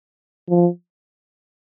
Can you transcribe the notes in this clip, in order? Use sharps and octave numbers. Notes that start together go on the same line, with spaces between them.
F3